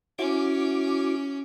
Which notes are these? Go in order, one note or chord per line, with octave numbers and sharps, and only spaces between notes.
C#4 E4 F#4 D6